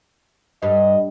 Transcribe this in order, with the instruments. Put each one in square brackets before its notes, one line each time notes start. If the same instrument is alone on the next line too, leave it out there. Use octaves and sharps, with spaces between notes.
[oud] G2 [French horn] D#5